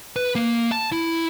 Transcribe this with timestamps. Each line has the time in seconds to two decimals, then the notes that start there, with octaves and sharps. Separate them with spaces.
0.16 B4
0.35 A#3
0.72 A5
0.92 E4